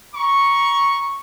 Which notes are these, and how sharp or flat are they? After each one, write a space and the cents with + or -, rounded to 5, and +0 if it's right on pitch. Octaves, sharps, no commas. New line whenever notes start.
A#5 +25 C#6 +0